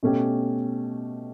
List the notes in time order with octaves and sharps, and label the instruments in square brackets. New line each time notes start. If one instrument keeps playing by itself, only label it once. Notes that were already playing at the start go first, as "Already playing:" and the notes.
[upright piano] B2 A3 C#4 G4